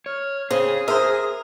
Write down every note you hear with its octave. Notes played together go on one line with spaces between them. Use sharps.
C#5 F6
C#3 C4 G#4 D#6
A#4 C5 E5